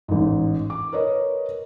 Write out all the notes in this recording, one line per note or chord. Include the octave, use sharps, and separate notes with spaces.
A1 G#2
D6
A#4 B4 C#5 D#5